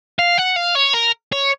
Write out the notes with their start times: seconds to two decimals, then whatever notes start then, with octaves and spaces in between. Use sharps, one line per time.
0.19 F5
0.38 F#5
0.56 F5
0.75 C#5
0.94 A#4
1.32 C#5